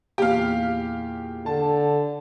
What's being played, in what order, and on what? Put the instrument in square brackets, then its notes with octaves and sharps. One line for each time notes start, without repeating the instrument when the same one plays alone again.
[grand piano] E2 A#2 [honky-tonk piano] G4 F5
[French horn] D3 [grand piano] A5